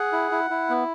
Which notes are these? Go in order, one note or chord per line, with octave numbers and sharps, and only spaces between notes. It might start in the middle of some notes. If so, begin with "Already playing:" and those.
Already playing: G#4 F#5
E4
E4
E4
B3